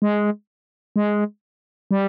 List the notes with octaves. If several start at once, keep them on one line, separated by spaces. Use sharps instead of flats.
G#3
G#3
G3